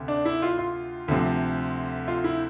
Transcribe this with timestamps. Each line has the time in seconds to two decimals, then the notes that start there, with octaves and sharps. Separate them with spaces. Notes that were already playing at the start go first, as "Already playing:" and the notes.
Already playing: D2 C3
0.08 D4
0.25 E4
0.42 F4
0.59 F4
1.08 D2 C3 F3
2.08 F4
2.24 E4